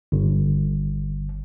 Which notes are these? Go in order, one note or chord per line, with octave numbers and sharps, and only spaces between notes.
G1